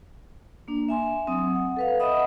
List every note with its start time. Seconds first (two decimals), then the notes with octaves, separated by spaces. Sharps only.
0.68 A#3 D4
0.89 E5 G#5 C6
1.27 F#3 C4 D#6
1.55 F#5
1.77 A4 B4 F5
2.00 D#5 E5 F#5 B5 D#6